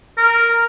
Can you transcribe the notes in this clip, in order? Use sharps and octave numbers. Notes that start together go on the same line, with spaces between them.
A#4